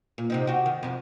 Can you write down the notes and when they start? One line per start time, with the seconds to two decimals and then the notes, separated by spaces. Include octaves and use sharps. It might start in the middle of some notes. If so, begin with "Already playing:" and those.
0.18 A#2
0.30 C3 C4 D#4
0.47 F#4 G4
0.66 D#3
0.83 F2 C3